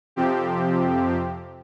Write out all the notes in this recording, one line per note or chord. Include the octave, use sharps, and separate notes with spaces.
F2 C3 F3 C4 G4